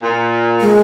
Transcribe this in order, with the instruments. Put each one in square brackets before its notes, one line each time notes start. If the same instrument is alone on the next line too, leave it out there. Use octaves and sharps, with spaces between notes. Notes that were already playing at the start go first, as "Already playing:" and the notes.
[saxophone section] A#2
[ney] G#3